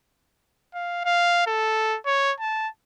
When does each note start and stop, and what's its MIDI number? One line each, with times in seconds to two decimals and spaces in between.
0.74 1.05 77
1.05 1.45 77
1.47 1.98 69
2.06 2.33 73
2.40 2.68 81